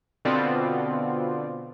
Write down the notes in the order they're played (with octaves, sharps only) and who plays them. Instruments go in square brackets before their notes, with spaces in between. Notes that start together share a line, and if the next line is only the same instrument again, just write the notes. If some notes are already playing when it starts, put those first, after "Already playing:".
[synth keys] B2 D3 B3 C4 F4 D5